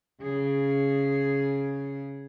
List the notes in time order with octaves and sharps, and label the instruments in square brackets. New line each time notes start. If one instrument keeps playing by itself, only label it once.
[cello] C#3 G#4